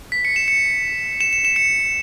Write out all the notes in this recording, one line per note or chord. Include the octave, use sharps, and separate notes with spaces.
B6
C#7
E7
C#7
E7
E7
E7
C#7